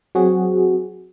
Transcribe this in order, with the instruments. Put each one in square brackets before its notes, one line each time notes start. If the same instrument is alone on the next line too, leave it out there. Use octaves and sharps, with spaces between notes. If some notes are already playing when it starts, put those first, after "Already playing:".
[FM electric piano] F#3 C4 F#4 G#4